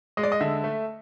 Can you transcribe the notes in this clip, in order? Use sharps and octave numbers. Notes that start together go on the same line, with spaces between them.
G#3 D#5
D5
D#5
D3 E5
A3